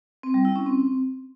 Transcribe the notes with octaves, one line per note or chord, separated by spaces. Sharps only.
C4
G3
E4
C#4
C4